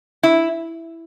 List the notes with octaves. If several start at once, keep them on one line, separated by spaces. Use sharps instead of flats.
E4